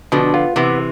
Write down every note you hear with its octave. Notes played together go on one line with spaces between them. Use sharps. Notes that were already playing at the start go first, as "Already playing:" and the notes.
B2 D3 F3
B3 F4
C3 E3 B3